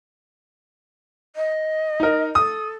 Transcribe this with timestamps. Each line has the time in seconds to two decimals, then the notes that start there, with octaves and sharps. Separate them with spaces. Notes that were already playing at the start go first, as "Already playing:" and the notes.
1.36 D#5
2.00 D#4 A#4
2.35 A4 D#6